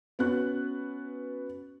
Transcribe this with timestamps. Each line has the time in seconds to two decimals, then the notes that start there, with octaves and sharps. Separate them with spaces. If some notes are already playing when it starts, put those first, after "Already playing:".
0.19 B3 C#4 F#4 F#6